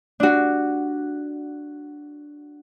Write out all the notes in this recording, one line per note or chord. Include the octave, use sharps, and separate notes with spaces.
D4 F#4